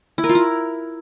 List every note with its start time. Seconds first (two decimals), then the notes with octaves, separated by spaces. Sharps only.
0.18 E4
0.24 A#4
0.29 F4
0.35 E4